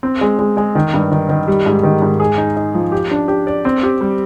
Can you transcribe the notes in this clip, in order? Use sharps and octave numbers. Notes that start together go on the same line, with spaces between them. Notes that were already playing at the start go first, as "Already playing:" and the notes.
C4
G#3
G#3
G#3
D#3
G2
D#3
D#3
G3
G#2
D#3
G#2
G#4
D#4
D#4
F3
G4
D4
G4
D5
C4
G4
G3